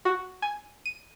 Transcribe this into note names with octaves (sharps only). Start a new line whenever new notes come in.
F#4
G#5
D#7